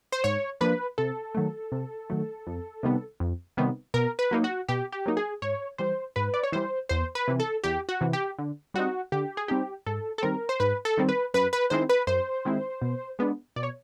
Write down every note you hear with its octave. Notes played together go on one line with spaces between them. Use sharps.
C5
G#2 C#5
F3 A#3 D4 B4
C3 A4
D#3 F#3 A3
C3
D#3 F#3 A3
F2
C3 D#3 G3 B3
F2
C3 D#3 G3 B3
B2 A#4
B4
F#3 A#3 D#4
F#4
B2 G4
G4
F#3 A#3 D#4
G#4
G#2 C#5
E3 G3 C5
G#2 B4
D5
C#5
E3 G3 C5
E2 C5
B4
C3 E3
A4
E2 G4
F#4
C3 E3
G4
D3
G3 C4 D#4 F#4
D3 G4
G#4
G3 C4 D#4 G4
G#2 A4
A4
D#3 G3 C4 A#4
C5
G#2 B4
A4
D#3 G3 C4
B4
F#2 B4
B4
D#3 G#3 C4 E4 C5
B4
F#2 C5
D#3 G#3 C4 E4
B2
G#3 B3 D4
B2 D5
C#5